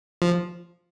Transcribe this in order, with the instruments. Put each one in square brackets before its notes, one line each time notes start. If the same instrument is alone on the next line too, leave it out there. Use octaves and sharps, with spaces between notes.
[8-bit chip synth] F3